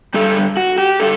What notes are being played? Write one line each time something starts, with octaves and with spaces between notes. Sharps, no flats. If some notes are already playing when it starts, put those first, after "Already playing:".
G2 D3 G3 A4
F#4
G4
D3 G3 A4